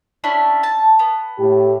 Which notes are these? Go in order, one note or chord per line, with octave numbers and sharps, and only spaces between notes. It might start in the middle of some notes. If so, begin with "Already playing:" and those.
C#4 D4 E4
A5
B3
A2 G4